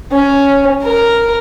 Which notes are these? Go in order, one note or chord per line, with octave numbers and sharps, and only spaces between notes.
C#4
A#4